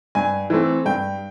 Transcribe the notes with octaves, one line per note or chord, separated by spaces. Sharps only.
G2 G#5
E3 A3 C4
G2 G5